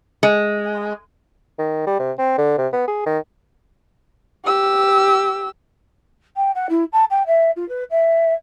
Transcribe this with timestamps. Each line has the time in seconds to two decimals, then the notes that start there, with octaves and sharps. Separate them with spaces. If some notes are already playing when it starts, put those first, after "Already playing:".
0.23 G#3
1.59 D#3
1.87 G3
1.99 C3
2.18 C4
2.38 D3
2.58 C3
2.73 B3
2.88 G#4
3.06 D#3
4.45 G4 E6
6.36 G5
6.55 F#5
6.69 E4
6.93 A5
7.10 G5
7.27 E5
7.56 F4
7.69 B4
7.90 E5